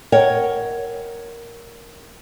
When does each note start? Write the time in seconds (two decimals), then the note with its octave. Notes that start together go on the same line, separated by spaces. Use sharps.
0.12 A#4 C#5 D#5 F#5 G5